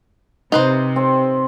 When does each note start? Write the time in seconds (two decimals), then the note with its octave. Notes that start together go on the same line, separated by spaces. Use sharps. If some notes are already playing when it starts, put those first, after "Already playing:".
0.52 C3 D#4 B4 C5
0.96 C4